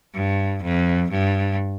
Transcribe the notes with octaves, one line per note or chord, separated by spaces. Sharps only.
G2
F2
G2